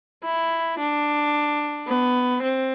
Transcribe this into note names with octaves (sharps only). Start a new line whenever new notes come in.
E4
D4
B3
C4